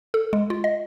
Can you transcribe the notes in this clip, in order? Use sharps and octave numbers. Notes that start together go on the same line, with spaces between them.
A4
G#3
F4
D#5